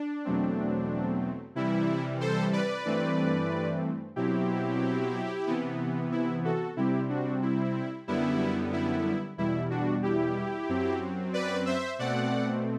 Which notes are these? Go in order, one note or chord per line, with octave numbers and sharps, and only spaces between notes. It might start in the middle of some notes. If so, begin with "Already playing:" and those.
Already playing: D4
E2 B2 F#3 A3 C4
C3 E3 G3 E4
A4 C5
B4 D5
G2 E3 A3 C4
B2 F#3 C4 E4 G4
C3 E3 B3
E4
F#4 A4
C3 G3 C4 E4 G4
D4 F#4
E4
F#2 D3 G3 B3 E4
E4
E2 B2 G3 E4
D4 F#4
E4 G4
F#2 F#3 C4
B4 D5
C5 E5
B2 A3 C4 D5 F#5